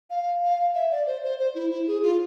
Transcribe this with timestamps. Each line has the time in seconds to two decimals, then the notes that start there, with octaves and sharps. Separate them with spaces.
0.10 F5
0.43 F5
0.74 E5
0.91 D5
1.06 C5
1.23 C5
1.39 C5
1.55 E4
1.71 E4
1.87 G#4
2.03 F4